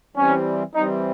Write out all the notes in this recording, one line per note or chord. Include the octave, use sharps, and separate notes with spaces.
E3 G3 C4 C#4
E3 G3 C4 D#4